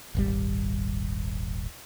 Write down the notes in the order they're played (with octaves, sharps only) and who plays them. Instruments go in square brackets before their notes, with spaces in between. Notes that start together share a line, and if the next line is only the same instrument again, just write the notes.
[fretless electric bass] D#1 G#1 G3